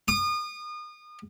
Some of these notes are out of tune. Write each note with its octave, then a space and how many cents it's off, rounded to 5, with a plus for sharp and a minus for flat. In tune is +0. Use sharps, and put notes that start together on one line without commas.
D#6 -35